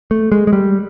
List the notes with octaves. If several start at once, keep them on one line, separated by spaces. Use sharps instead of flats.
A3
G#3
G#3
G3